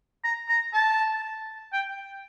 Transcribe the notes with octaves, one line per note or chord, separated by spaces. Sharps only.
A#5
A#5
A5
G5